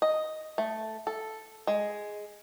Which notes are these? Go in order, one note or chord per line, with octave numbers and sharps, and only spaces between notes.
D#5
A3
A4
G#3